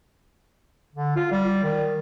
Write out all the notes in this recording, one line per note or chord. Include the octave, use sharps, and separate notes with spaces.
D3
F4
G3
D#3